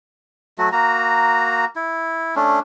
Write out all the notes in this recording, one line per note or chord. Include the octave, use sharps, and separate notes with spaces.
F#3 A3 F#4
A#3 F#4 A#5
E4
A3 C#4 D4